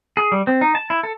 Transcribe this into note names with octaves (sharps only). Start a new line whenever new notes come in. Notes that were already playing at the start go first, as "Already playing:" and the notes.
G#4
G3
C4
D#4
A5
E4
A4